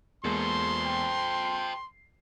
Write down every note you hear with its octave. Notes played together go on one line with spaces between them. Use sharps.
E2 G#3 A#3 A4 C5 C6
G5
C7